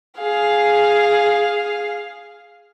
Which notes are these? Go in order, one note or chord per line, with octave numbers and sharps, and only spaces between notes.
G#4 F5